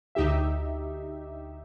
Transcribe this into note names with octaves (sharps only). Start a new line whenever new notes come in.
D2 D#4 G4 E5